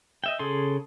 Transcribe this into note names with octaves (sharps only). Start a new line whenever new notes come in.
D#5 E5 G5
C#3 G#4 A4 C6